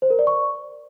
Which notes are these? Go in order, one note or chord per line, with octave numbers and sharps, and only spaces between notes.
C5
A#4
D5
C#6